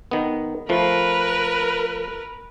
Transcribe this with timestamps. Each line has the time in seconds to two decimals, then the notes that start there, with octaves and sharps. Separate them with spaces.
0.11 D#3 B3
0.69 F3 A3 A#4 B4